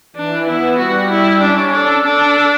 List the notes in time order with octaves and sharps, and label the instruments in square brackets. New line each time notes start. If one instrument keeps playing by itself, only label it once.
[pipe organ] E3 [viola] D4
[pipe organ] B3 [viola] E4
[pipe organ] G3 [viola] F#4
[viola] E4
[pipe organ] C#4 [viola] D4
[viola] D4 [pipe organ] A4
[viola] D4 [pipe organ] A4